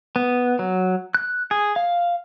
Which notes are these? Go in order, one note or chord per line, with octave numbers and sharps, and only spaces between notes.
B3
F#3
F#6
G#4
F5